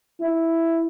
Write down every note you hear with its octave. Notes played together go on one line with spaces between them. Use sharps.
E4